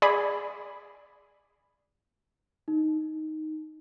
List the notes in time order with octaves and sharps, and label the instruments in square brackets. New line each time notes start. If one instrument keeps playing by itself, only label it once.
[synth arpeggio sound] G#4 D5 B5
[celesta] D#4